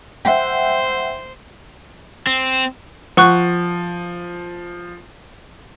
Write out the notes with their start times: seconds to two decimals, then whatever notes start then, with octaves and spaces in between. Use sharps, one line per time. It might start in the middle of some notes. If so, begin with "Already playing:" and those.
0.25 C5 E5 F#5 G5
2.27 C4
3.17 F3 F#5 C#6 F#6